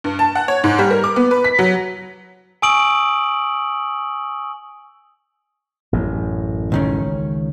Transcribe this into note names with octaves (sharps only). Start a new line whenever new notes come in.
G2
A5
F#5
C#5
G#2
G3
A#4
D6
B3
B4
B6
F#3
G#5 C#6 D#6 E6 D7 F#7
A1 F#2
C#2 D#3 C#4